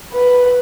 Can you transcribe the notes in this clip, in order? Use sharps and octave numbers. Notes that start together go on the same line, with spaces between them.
B4